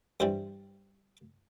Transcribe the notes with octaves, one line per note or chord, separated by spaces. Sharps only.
G2 E3 G3 C5